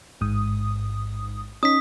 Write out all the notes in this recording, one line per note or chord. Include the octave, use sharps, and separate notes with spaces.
A1 G#2 D#6
C#4 D#4 D#6 B6